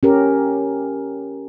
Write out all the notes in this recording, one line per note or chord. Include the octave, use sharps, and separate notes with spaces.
C#4 G4 A#4